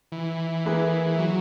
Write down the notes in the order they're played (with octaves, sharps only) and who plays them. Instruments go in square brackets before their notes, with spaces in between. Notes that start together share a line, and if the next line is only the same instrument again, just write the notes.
[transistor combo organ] E3
[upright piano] A#3 E4 G#4 B4
[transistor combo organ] F#3